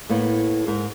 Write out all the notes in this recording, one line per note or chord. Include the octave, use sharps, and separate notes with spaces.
A2 A#3 B3
G#2 A#4